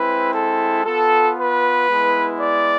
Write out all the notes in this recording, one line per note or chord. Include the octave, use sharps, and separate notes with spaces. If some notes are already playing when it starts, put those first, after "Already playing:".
Already playing: G#3 C4 E4 B4
A4
B3 F4 A4
B4
G#3 B3 E4
D5